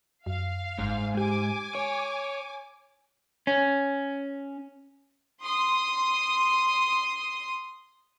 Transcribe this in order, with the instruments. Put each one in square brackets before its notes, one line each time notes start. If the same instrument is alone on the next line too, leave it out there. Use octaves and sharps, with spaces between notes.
[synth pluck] F#2 [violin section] F5
[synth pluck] G1 [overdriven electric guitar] G#2
[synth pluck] G#3 G4 [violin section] G#5 D6
[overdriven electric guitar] C#5
[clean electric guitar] C#4
[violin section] C6 D#6